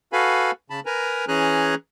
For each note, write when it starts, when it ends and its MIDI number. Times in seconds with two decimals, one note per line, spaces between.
0.13 0.51 66
0.13 0.51 69
0.13 0.51 71
0.13 0.51 77
0.13 0.51 80
0.13 0.51 83
0.70 0.80 49
0.70 0.80 81
0.70 0.80 83
0.86 1.25 70
0.86 1.25 71
0.86 1.25 80
0.86 1.25 82
1.28 1.75 52
1.28 1.75 61
1.28 1.75 68
1.28 1.75 80
1.28 1.75 82
1.28 1.75 90